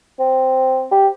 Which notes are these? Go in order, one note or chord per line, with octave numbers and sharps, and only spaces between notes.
C4
G4